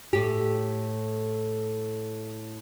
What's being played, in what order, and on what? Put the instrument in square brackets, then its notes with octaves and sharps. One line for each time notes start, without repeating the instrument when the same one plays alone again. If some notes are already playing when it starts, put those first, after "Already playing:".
[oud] A2 G4